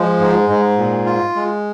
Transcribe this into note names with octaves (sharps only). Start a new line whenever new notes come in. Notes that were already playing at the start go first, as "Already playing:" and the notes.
Already playing: F3 G#3
G#2
G#2
A#2
F4
G#3